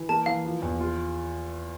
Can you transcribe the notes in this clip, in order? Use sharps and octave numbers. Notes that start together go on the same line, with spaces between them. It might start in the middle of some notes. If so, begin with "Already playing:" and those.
Already playing: E3
A#3 A5
E3 F5
F3
E2
F4